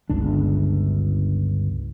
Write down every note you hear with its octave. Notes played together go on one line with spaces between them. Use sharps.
G1 C#2 D4